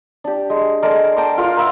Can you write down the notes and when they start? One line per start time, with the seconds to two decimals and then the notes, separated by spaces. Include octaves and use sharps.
0.24 D4 G4
0.50 G#3
0.83 G#3 A4 A#4 D5
1.17 G5 A5 A#5 D6
1.38 F4 A#4 F5 D6
1.57 A#4 B4 E5 F#5